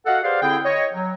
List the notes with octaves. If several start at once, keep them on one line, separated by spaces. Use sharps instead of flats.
F#4 A4 D#5 F5 F#5
G4 G#4 B4 C5 D5 F5
D3 C4 E4 G#4 G5
C#5 D#5
F#3